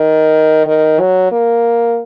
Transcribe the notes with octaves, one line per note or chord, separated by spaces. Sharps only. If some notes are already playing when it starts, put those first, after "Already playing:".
Already playing: D#3
D#3
F#3
A#3